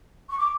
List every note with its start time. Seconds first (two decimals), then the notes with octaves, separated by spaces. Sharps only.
0.28 C#6
0.38 D6